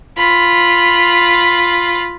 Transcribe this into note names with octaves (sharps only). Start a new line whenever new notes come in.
F4 B5